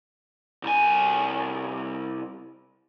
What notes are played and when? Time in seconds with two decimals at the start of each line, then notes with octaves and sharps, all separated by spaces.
0.63 C2 G#5